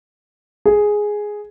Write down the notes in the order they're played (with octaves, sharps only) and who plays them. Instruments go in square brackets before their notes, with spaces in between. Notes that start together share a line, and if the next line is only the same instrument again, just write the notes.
[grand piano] G#4